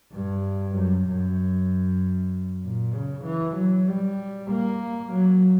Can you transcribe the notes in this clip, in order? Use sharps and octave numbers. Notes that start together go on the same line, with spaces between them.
G2
F#2
F#2
A#2
C#3
E3
F#3
G3
A#3
F#3